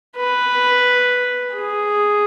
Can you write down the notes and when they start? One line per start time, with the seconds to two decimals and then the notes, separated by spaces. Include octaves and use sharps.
0.17 B4
1.55 G#4